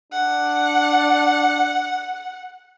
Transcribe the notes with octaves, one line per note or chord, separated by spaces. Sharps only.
D4 F#5